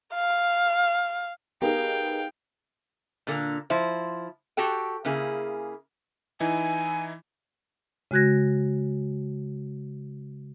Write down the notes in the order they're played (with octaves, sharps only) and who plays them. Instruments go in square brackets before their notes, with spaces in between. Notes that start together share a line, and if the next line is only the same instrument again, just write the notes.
[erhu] F5
[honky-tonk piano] B3 D#4 G#4 [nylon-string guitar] G4 A#4 [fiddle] F5 G5
[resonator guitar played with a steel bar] A#2 D3 A#3
F3 E4 C5
F#4 G4 A4 G5
C#3 A#3 E4 G#4
[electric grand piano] E3 D#4 E4 [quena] G#5
[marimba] C#3 G#3 F#4 F#6 G#6 A#6